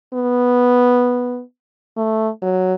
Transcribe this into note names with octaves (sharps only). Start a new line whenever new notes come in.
B3
A3
F#3